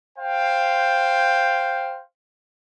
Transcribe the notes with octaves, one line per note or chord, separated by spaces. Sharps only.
C5 F5 G5